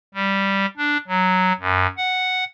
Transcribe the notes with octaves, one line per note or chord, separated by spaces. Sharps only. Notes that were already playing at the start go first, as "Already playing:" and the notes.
G3
D4
F#3
F#2
F#5